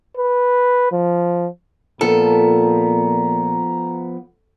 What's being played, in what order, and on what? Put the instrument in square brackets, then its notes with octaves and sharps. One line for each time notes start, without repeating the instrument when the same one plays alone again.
[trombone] B4
F3
[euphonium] A#2 [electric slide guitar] F3 B3 [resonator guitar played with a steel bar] A4 [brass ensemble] A#5